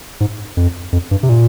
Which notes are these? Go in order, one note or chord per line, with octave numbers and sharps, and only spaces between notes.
G#2
F2
F2
G2
C3
A#2